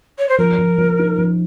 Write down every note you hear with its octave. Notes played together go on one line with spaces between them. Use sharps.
C#5
C5
F3 A#4
F3
F3
D#4
F3